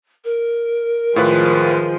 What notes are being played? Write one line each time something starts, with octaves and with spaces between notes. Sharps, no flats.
A#4
A2 D#3 F3 G#3 F4 B4